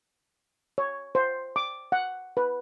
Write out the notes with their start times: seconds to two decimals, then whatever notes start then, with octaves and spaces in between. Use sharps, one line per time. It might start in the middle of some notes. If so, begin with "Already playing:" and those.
0.78 C#5
1.15 C5
1.56 D6
1.92 F#5
2.37 B4